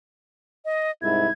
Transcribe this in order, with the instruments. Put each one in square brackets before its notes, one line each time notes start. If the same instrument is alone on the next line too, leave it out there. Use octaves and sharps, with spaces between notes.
[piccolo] D#5
[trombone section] C2 G#2 E4 [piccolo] G#6